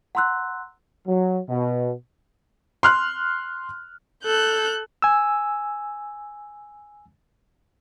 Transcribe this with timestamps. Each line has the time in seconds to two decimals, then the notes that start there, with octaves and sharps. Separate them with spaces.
0.15 F#5 A#5 C6 E6 F#6
1.07 F#3
1.48 B2
2.83 C6 F6 F#6
4.24 A4 F#6 G6
5.02 G#5 E6